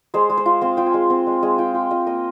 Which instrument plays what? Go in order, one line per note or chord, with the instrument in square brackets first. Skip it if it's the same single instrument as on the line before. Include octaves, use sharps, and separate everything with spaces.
[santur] G#3 C5
G#3
C5
F4
C4 F5
F4 G5
G#5
G#3
C4
G#3
G#3
F4 G5
F4 G5
F4 D#5
A#3 D#5